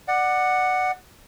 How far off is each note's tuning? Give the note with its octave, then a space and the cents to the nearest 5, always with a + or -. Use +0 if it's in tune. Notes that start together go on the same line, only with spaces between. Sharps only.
D5 +25 F#5 +0